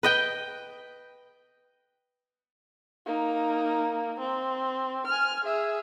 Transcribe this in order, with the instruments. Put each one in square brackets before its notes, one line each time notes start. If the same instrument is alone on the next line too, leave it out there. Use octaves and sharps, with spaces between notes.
[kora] B4 D#5 G5
[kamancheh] A#3 D#4
C4
G#5 F6
G#4 E5